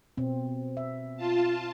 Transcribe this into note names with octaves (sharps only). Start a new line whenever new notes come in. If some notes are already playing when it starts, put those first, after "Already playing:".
B2 C4
E5
F4 A5